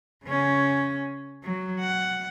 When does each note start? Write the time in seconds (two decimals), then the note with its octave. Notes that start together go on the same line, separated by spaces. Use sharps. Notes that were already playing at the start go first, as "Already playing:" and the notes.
0.25 C#3 C#4
1.43 F#3
1.80 F#5